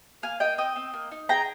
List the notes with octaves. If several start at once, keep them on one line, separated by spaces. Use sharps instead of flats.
A#3 F5 G#5
A#3 D#5 G5
C4 D#5 G5
C4
A#3
D#4
G#4 G5 A#5